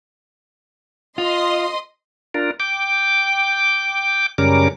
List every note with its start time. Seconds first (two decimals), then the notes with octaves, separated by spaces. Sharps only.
1.18 F4 D#5 C6 D#6
2.34 D4 F4 A#4
2.60 G5 D6
4.38 F#2 C#3 G3 C#4 A#4 D6